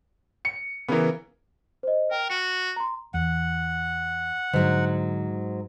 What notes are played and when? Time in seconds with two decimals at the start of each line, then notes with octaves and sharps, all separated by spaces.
0.45 C#7
0.88 C#3 E3 B3 A#4
1.83 C5 D#5
2.11 A#4 G5
2.30 F#4 C#7
2.76 A#5 C6
3.14 E2 F#5
4.53 G#2 D3 F#3